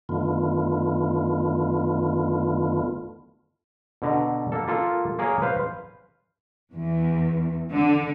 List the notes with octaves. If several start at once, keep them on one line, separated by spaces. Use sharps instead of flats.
F#2 D3 D#3 A3 B3 F4
B2 D3 A#5
A#3 A4
A#3 F4 A4
A#3 G#4 A#4 C#5
B4 C5 F5
E2
D3